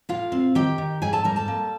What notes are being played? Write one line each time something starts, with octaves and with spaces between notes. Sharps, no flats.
A2 F4 F5
C4
D#3 G4 G5
D#3
G#2 G#4 G#5
A4 A5
G3 A#4 A#5
A4 A5
A#3